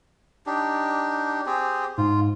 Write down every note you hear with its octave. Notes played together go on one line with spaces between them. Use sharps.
D4 D#4 G4
C4 G4 G#4
G#2 F4